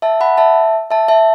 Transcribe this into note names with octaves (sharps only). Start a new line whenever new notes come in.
E5 A5
F#5 B5
E5 A5
E5 A5
E5 A5